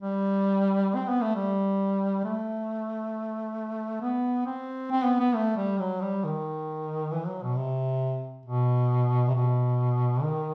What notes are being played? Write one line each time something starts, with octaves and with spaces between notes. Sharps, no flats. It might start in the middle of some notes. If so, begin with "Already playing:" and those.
G3
C4
B3
A3
G3
A3
B3
C4
C4
B3
B3
A3
G3
F#3
G3
D#3
E3
F#3
B2
C3
B2
C3
B2
D#3